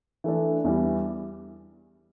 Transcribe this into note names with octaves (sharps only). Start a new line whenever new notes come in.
E3 A3 D4
E2 E3 G3